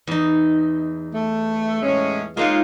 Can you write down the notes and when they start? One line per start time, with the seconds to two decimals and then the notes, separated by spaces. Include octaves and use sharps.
0.07 E2 D#4
1.14 A3
1.83 A2 G#3 C#4
2.37 G#3 A#3 D#4 F4 C#5